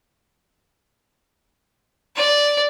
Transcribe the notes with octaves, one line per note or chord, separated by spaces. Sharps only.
D5